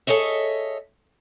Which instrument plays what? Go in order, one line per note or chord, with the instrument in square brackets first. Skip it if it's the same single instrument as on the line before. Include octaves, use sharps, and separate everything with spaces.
[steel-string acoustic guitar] G#4 A4 C#5 D#5 E5